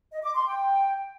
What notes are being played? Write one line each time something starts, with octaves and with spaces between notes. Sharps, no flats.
D#5
D6
C6
G5